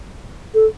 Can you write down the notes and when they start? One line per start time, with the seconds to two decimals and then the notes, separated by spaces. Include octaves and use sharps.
0.54 A4